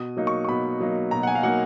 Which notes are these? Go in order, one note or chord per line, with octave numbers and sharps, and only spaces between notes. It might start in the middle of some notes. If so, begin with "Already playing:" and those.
Already playing: B2 D#6
F#3 A#3 D#4
C#6
C#6
B2 B5
F#3 A#3 D#4
B2 A#5
F#5
G#5
F5
F#3 A#3 D#4 F#5